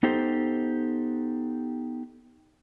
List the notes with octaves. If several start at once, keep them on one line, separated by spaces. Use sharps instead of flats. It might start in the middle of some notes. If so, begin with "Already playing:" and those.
B3 D#4 G4 A4 C5